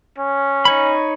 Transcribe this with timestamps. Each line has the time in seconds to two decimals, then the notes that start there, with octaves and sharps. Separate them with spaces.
0.18 C#4
0.65 D#4 C#5 B5